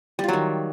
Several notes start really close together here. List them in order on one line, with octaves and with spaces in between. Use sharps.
G3 F4 F#3 D#3